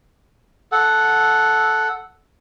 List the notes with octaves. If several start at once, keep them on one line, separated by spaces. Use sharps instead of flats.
A4 F#5